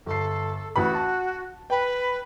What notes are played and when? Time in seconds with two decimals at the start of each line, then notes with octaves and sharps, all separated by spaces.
0.06 G1 A4 C7
0.76 A1 F#4 B4 B5
0.94 A5
1.70 B4 G5